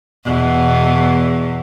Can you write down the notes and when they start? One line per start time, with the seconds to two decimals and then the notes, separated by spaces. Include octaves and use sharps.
0.25 E2 B2